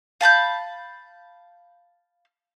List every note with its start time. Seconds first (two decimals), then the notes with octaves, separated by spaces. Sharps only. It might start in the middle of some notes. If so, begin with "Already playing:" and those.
0.21 F5 A5 B5 G6